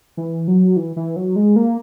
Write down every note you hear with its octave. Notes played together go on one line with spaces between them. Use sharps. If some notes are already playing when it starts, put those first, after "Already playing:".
E3
F#3
E3
E3
F#3
G#3
A#3